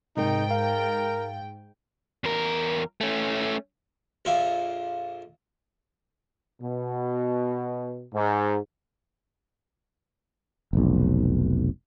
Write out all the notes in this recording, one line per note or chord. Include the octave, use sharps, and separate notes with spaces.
G#2 C3 G#3 D#4 A#4 G5
A#4 F5
E2 A#4
A3 C#4
A#1 F2 A#2 F4 E5
B2
G#2
F1 B1